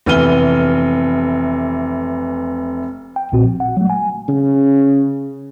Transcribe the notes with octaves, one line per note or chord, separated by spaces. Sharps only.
F1 E3 B3 F6 D#7 G7
G5
A#1 A#2 C4 F#4
F3
F#5
F#3 G3 A3
G#5
C#3